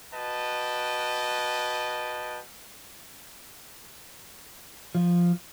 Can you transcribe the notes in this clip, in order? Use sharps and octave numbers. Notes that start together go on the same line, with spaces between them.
F#4 B4 D#5 G5 A5
F3